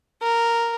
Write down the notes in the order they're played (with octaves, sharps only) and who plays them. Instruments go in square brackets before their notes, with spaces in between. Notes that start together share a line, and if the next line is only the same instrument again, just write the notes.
[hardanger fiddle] A#4